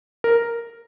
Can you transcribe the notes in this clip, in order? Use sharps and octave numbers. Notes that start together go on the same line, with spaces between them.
A#4